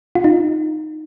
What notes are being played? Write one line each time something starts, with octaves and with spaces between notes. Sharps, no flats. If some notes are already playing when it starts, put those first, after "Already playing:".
F4
D#4